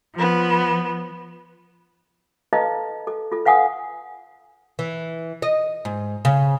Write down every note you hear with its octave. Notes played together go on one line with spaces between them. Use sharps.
F3 B3
E4 A4 B4 D#5 F5 A5
A4
F4 A4
B4 F5 F#5 G#5 D#6
E3
D#5
G#2
C#3